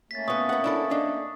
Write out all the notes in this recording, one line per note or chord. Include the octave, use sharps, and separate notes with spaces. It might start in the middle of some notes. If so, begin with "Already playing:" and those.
A3 A#3 C#4 A6 B6
A#2 B3 C#6 D#6
B3 F#5
D4 E4 A4
D4 D#4